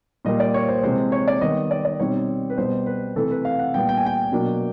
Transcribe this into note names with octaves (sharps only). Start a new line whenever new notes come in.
A#2 G3 A#3 D#5
D5
C#5
C5
C3 E3 G#3 C5
C#5
D5
D#3 G3 B3 D#5
D5
D5
B2 G3 C4 D#4 C#5
B4
B2 G3 B3 C5
B4
C3 E3 A3 A4
B4
F5
F#5
A#2 G3 B3 G5
G5
G#5
G5
B2 F#3 A#3 D4